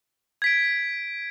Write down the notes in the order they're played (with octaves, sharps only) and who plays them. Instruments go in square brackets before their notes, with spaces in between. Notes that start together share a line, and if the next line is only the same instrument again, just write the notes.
[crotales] G#6 B6 D7